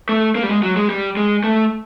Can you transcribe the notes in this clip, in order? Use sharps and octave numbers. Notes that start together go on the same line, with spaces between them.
A3
A#3
G3
G#3
F#3
G#3
G3
G#3
A3